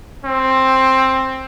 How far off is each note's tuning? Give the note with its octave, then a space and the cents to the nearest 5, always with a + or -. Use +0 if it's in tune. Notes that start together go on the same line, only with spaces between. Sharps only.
C4 +10